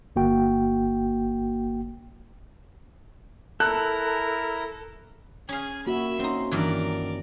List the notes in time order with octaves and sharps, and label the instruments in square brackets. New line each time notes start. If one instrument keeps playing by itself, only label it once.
[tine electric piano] G1 A#3 F#4 G5
[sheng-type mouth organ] E4 A#4 A#5 [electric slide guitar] A4 [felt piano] F#6
[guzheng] C#4 F5 [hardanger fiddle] G#4 G#5
[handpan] A#3 F#4 [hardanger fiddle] E5 B5
[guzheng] C4 D#4 [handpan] C#4 [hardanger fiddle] C6
[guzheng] G2 D#3 E3 [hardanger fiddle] A#4 D5